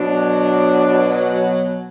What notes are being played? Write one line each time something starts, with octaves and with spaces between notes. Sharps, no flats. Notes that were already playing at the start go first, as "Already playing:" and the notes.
Already playing: B2 F#3 D4